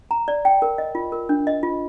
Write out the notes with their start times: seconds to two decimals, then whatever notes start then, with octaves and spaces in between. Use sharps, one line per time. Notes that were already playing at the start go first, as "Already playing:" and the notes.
0.11 A#5
0.28 D5
0.45 G5
0.62 A#4
0.78 D#5
0.95 F4
1.12 A#4
1.29 D4
1.47 D#5
1.63 F4